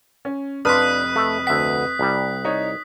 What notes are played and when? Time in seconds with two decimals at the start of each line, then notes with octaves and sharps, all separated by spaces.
0.25 C#4
0.65 F1 D4 F4 B4 D#6 F6 F#6 B6
1.16 A3
1.47 D2 E5 F#5 B6
1.99 C2 G3
2.45 D#4 C#5